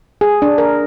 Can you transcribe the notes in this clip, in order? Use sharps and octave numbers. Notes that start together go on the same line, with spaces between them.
G#4
D4
A#4